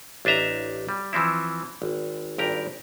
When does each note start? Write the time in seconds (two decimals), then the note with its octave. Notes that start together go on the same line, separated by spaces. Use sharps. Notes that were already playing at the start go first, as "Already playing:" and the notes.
0.25 A1 D4 D#5 E5 A#5
0.89 G3
1.13 E3 F3 C4 E4
1.82 G#1
2.38 G#1 G2 G4 A#4 A#5